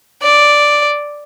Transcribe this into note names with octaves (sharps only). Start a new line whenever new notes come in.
D5